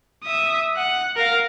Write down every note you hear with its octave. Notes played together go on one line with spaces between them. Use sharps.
E5 D#6
F#5
A#4 F5